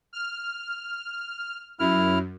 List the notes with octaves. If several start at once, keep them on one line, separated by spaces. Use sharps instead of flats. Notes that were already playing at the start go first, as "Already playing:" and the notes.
F6
F#2 E4 F6